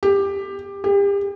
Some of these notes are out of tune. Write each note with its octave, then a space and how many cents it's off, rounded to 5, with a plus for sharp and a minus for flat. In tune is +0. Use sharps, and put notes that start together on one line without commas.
G4 +15
G4 +35